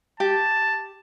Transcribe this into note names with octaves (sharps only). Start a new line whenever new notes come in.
G4 A5